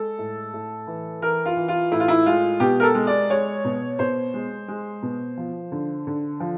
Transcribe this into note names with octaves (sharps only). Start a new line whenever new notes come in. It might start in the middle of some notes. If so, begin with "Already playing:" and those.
Already playing: G#3 A4
A2
A2
E3
E3 A#4
F4
E3
F4
A2 E4
F4
E4
G#3 F4
B2 G4
A#4
A4
G#3
D5
G#3 C#5
B2
B2 C5
G#3
G#3
B2
F3
D3
D3
F3